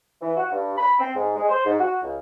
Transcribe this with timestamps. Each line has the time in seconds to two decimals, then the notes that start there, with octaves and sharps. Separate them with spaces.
0.21 E3
0.37 F#4
0.51 G2
0.78 B5
0.99 C4
1.15 G#2
1.36 G#3
1.49 C5
1.65 G#2
1.80 F#4
2.02 C#2